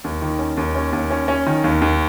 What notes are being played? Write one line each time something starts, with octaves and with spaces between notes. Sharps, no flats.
D#2
D#3
C#4
D#2
C#4
D#2
C#4
C#4
D#3
D#2
D#2